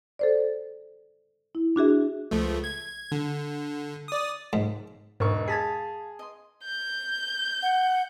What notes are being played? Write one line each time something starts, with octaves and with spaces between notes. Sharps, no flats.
A4 C5 D5
E4
D4 F#4 G#4 E5
C#2 F3 A3
G#6
D3
D5 D#6
G#2
E1 G#2 A#4 B4 C#6
G#4 F5 A5 B5 G#6 A6 B6
D#5 C6
G6
F#5